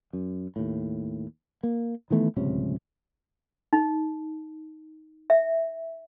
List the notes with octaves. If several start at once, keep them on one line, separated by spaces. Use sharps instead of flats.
F#2
D#2 A2
A#3
D#3 E3 A3 B3
D1 C#2 C3 C#4
D#4
E5